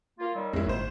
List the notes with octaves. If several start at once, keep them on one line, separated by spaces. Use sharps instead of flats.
A#3 F4
D#3 F#3 G3
F2 G#3 E4
G1 A2 C5